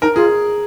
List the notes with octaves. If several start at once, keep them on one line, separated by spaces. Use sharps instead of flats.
D#4 A#4
F4 G#4